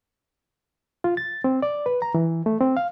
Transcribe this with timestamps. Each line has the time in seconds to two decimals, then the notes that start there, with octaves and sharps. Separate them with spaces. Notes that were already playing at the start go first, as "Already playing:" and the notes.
1.04 F4
1.17 A6
1.44 C4
1.62 D5
1.86 B4
2.02 A#5
2.14 E3
2.46 A3
2.61 C4
2.77 F5